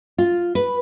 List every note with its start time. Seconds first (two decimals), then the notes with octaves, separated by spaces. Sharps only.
0.18 F4
0.55 B4